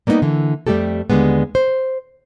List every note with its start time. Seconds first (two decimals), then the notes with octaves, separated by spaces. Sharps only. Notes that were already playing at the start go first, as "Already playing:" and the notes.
0.07 G3 A#3 B3 C#4 D#4
0.22 D3 E3
0.67 F2 G3 A3 D#4 G4 A4
1.10 D#2 D3 G3 G#3 B3
1.55 C5